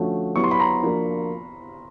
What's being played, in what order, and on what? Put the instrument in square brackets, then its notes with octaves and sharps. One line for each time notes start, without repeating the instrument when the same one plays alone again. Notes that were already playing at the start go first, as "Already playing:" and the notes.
Already playing: [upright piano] D3 F3 A3 C#4 F#4
[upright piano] F#3 B3 E4 G4 [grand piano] C#6
[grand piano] C6
B5
A#5 C6
[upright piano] F3 A#3 D4 F#4 A#4